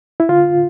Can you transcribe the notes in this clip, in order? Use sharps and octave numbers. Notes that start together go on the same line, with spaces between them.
E4
D3 F4